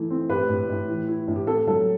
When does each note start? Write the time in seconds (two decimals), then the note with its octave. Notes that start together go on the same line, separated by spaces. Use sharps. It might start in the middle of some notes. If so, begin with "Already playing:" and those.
Already playing: E3 A3 D#4
0.10 C4
0.29 A2 G4 B4
0.49 A2
0.69 A2
0.89 E3
1.08 E4
1.28 A2
1.36 G4
1.47 C4 A4
1.67 F#3 A4